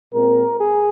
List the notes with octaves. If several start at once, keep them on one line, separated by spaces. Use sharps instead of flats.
A#2 G#3 C4 A#4
G#4